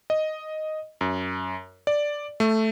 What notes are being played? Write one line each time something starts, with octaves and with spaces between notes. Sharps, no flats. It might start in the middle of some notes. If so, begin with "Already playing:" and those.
D#5
F#2
D5
A3